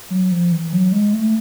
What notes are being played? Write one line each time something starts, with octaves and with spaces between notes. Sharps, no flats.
F#3
F3
E3
F#3
G#3
A3